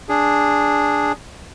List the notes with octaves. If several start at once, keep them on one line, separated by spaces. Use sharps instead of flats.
D4 G#4